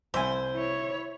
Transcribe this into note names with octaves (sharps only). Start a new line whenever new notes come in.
C2 C5 E5 G#5
E4 C#5